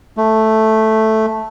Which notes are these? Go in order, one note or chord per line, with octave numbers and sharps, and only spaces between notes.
A3